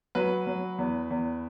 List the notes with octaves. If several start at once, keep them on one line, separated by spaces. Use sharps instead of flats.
F#3 B4
F#3
E2
E2